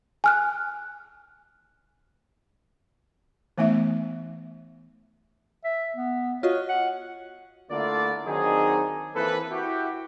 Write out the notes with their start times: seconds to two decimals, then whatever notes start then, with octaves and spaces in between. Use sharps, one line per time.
0.24 G#5 F6 F#6
3.58 E3 A3 B3 D#4 E5
5.64 E5
5.96 B3
6.43 F4 F#4 C#5 D#5
6.69 F#5
7.71 D3 A3 A#3 E4 F4 D5
8.26 D#3 F#3 C4 D4 D#4 G#4
9.15 E3 A#3 C4 E4 A4 B4
9.50 E4 F#4 G4